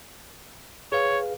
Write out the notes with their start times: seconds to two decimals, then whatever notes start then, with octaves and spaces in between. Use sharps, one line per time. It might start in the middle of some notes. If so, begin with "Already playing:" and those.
0.92 G#4 B4 C#5 F5